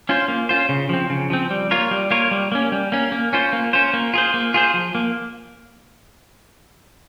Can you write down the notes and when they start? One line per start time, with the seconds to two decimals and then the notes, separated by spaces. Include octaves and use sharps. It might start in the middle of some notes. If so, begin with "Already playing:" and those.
0.09 C#4 F4 C5
0.28 A#3
0.49 C#4 F4 C5
0.69 C#3
0.89 F3 C4
1.10 C#3
1.30 F3 C4
1.50 G3
1.71 A#3 F4 A#4 C#5
1.91 G3
2.11 A#3 F4 A#4 C#5
2.31 G3
2.52 A#3 C#4
2.72 G3
2.92 A#3 C#4
3.12 A#3
3.33 C#4 F4 C5
3.53 A#3
3.73 C#4 F4 C5
3.94 A#3
4.14 F4 G#4 C5
4.34 A#3
4.54 F4 G#4 C5
4.74 F3
4.95 A#3